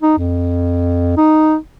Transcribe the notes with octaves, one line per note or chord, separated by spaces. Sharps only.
D#4
F2
D#4